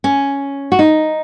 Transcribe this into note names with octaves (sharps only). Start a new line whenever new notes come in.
C#4
F#4
D#4